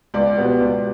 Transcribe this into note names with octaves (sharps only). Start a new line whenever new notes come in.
C#2 D5
B2 G3 B3
C#2